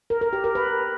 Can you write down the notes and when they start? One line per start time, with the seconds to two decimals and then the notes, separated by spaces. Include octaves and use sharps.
0.10 A#4
0.21 A#4
0.33 G4
0.44 A#4
0.55 B4